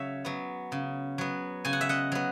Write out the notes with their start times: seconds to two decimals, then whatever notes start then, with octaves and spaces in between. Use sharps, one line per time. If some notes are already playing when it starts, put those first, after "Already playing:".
Already playing: C#3 F#3 C#5 E5
0.25 F#3 B3
0.72 C#3
1.18 F#3 B3
1.65 C#3 G#5
1.73 F#5
1.81 E5
1.89 D#5 F#5
2.12 F#3 B3